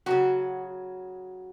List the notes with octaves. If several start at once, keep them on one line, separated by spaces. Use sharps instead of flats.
C#3 F#3 F#4